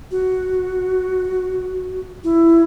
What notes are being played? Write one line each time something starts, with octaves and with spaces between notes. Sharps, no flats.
F#4
E4